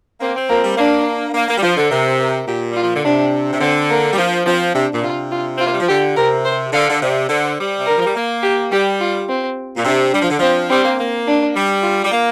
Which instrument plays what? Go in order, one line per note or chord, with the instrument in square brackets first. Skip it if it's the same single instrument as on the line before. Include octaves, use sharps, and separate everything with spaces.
[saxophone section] A#3 [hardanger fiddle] C4
[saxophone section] C4
[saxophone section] F3 [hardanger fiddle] A#3
[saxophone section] G3
[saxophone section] A#3 [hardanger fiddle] D4
[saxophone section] A#3
A#3
G3
[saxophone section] F3 [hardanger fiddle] C5
[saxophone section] D3
[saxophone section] C3 [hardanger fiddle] A#4
[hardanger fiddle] A#4
[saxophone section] A#2 [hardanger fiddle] G4
[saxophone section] G3 [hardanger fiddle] F4
[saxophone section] F3
D3
[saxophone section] C3 [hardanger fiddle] D4
[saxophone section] C3
[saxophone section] D3 [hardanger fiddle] C4
[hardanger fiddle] A#3
[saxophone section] G3
F3
[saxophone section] F3 [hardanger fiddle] C4
[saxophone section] C3 [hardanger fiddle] D4
[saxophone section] A#2
[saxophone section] C3 [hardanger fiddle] F4
[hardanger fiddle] F4
[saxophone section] C4
[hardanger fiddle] F4
[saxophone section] A#3
G3
F3
[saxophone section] D3 [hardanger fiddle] G4
[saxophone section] C3 [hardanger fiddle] A#4
[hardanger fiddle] C5
[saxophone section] D3 [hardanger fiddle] F5
[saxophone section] D3
[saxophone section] C3 [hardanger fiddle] D5
[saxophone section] D3 [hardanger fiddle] C5
[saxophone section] G3
C3
[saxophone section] D3 [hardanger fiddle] A#4
[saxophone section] F3
G3
A#3
[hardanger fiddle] G4
[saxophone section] G3 [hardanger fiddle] G4
[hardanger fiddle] F4
C4
[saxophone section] A#2
[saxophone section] C3 [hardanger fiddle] D4
[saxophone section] G3 [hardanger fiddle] D4
[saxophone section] F3
D3
[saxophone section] F3 [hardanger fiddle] C4
[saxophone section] G3 [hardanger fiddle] C4
[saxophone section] A#3
A#3
[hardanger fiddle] D4
[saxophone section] G3
[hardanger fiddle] F4
[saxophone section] G3
A#3